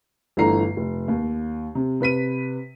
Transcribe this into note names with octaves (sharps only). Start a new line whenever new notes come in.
G1 D3 E3 A3 A#5 C7
F1
D#2
C3
C3 B4 B6 D#7